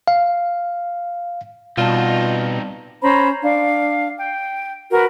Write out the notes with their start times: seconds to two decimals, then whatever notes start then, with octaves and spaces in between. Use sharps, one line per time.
0.08 F5
1.78 B2 G3 C4 D#4 F4 D5 A5
3.02 C#4 C5 A#5 B5
3.42 D4 F5
4.17 G5
4.91 F#4 A#4 B4